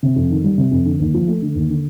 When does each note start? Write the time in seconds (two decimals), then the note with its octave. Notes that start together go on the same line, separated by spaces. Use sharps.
0.03 C3
0.16 F2
0.30 D#3
0.44 G3
0.58 C3
0.71 F2
0.85 D3
0.99 D#2
1.14 F3
1.27 A3
1.42 D3
1.55 D#2
1.69 D3